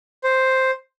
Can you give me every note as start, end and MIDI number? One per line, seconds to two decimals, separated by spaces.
0.24 0.71 72